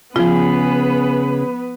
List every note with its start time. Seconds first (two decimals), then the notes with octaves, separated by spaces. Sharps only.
0.16 C#3 F3 B3 F4 G#4 B4